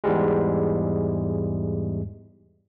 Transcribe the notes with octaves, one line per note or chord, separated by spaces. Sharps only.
E2 G#2 G3 G#3